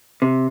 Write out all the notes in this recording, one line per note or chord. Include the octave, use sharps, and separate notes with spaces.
C3